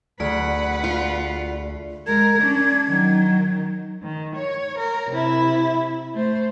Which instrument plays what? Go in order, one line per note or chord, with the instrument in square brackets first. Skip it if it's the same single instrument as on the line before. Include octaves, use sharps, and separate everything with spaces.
[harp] D2 [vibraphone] A3 G#4 D5 [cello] B4 F#5
[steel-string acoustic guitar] F4
[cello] G#3 A#4 [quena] G#6
[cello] C#4 D4
D#3 F#3
D#3
C#5
A#4
C3 E4
A3 C5